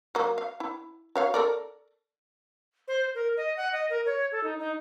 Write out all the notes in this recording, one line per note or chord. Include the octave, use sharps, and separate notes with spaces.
F#3 A#3
F5
E4
F#4 C#5 F5
A4 A#4 D5
C5
A#4
D#5
F#5
D#5
A#4
C#5
A4
D#4
D#4